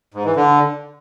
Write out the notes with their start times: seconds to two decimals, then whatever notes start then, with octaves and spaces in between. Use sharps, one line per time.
0.14 G#2
0.25 E3
0.36 D3